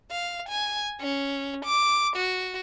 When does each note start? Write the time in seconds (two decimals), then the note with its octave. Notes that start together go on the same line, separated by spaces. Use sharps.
0.11 F5
0.49 G#5
1.01 C#4
1.65 D6
2.16 F#4